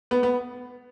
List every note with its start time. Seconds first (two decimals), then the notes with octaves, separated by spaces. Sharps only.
0.11 B3
0.23 B3